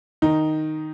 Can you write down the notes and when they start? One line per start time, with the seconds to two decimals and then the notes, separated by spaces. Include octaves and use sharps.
0.22 D#3 D#4